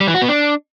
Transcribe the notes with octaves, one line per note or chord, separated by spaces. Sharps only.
G3
E3
F#4
B3
D4